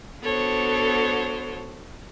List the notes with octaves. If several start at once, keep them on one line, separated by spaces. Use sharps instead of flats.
B3 D4 F#4 A4 C5 C#5